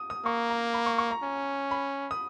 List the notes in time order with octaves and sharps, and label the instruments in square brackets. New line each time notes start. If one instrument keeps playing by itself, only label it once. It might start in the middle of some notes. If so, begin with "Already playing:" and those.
Already playing: [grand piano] D#6
D#6
[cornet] A#3 [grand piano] C#6
[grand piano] A#5
B5
C#6
C#6
A#5
[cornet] C#4
[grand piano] B5
D#6